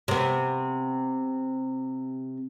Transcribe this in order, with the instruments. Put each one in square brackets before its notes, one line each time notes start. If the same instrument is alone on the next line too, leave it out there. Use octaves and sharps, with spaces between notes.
[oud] C3 B3